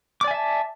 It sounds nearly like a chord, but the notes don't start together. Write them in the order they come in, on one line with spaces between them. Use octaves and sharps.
D6 D5 G#5 E5 A5